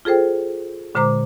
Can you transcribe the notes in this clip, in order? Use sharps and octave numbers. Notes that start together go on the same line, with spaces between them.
F4 G#4 A4 C5 G5
A#2 D3 G#3 C5 A#5 D6